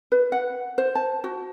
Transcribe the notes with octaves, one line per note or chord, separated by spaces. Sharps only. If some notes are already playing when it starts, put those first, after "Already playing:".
B4
F#5
C5
A5
F#4